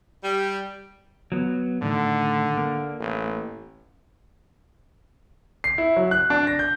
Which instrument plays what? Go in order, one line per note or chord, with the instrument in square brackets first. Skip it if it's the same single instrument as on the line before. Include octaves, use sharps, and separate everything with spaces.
[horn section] G3
[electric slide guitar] F#3 B3
[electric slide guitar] A2 D#3 [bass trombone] D3
[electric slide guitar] A#3
[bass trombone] A1
[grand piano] C7
E4
F#3
F#6
D4
A#6
G6